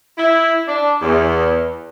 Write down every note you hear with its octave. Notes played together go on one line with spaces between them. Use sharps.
E4
D4
E2